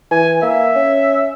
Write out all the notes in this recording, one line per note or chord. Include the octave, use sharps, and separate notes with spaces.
E3 G#5
A#3 E5
C#4